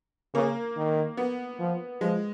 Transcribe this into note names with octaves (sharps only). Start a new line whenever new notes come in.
C#3 A#3
D#3
B3
F3
F3 G#3